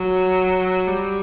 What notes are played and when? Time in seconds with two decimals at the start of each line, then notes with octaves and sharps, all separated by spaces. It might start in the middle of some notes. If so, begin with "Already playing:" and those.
Already playing: F#3
0.88 G3